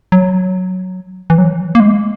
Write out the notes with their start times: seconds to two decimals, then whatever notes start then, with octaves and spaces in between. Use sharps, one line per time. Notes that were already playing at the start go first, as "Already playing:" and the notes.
0.12 F#3
1.30 E3
1.38 F#3
1.75 A#3
1.80 G#3